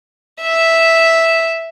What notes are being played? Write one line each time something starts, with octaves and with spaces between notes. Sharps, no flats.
E5